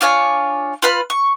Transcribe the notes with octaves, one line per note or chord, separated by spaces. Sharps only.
D4 F4 C#5 G#5
F4 B4 B5 F6
C#6